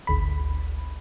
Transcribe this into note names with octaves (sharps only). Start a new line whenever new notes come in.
G#1 D2 B5